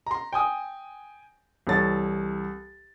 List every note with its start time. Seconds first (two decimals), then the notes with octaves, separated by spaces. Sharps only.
0.06 A#5 C6
0.33 G5 G#5 D#6
1.67 C2 E3 A4 C#5 A6